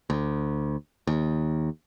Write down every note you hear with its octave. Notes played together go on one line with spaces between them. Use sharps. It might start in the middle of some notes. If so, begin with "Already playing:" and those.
D2
D#2